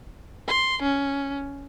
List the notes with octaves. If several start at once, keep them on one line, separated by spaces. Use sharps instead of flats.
C6
C#4